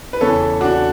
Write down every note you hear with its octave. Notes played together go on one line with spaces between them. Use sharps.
B4
E2 C#3 E3 A4 C#5
D4 F#4